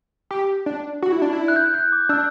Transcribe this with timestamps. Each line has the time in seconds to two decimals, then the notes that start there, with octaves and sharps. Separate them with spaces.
0.31 G4
0.66 D4
1.02 F#4
1.12 E4
1.22 D4
1.33 E4
1.48 F#6
1.56 G6
1.74 F#6
1.92 D6
2.09 D4 E6